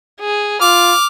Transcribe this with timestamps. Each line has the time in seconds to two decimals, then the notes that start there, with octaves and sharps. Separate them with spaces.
0.21 G#4
0.61 F4 D6 F6